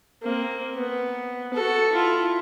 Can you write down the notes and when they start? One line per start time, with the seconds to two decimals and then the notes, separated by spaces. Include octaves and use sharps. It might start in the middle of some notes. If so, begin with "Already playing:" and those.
0.23 A#3 C4
0.75 B3
1.54 F#4 A4
1.92 E4 F4